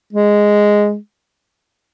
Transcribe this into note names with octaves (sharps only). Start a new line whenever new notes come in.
G#3